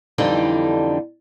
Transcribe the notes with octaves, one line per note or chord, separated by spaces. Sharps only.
F2 D3 E3 G3 D4 D#4